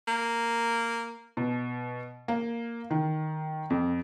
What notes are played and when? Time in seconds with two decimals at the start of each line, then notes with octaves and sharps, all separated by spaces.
0.08 A#3
1.37 B2
2.28 A#3
2.90 D#3
3.70 F2